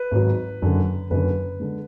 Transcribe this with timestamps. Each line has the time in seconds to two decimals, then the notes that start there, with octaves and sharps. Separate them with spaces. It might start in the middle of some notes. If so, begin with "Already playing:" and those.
Already playing: B4
0.11 G#1 G#2 F#3
0.62 F#1 F#2 D3
1.10 F#1 F#2 D3 B4
1.60 D3 G#3